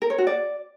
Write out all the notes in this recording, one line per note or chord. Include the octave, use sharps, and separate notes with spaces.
A#4
C#5
F#4
D5